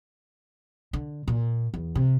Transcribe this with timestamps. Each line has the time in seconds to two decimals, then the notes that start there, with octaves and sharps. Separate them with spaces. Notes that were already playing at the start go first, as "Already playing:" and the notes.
0.93 D3
1.28 A#2
1.74 E2
1.95 C3